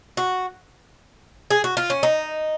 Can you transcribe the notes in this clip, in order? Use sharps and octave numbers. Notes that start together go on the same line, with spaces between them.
F#4
G#4
F#4
F4
C#4
D#4